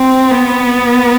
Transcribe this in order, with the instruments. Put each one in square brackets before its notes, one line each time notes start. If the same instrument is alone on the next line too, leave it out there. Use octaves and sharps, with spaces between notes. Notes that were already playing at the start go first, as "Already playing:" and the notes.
Already playing: [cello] C4
B3